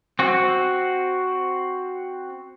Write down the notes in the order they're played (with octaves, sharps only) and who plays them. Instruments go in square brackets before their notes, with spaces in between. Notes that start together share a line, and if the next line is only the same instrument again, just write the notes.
[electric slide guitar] C4 F#4